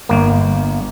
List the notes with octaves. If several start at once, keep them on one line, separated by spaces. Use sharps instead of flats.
G1 A#3